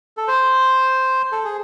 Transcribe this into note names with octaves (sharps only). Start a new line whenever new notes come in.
A4
C5
A4
G#4